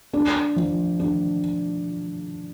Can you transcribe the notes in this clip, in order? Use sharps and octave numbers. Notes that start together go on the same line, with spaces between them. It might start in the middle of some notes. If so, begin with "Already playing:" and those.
D4
F3
D4